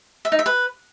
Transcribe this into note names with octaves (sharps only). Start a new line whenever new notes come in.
E5
D#4
E5
B4